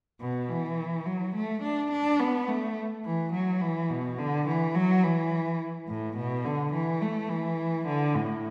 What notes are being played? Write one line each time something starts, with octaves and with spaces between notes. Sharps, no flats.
B2
E3
F#3
A3
D4
D4
B3
A3
E3
F#3
E3
B2
D3
E3
F#3
E3
A2
B2
D3
E3
A3
E3
D3
A2